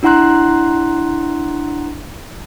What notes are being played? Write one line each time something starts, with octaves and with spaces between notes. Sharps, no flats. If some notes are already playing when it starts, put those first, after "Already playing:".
D4 E4 F#5 A#5 C6 F#6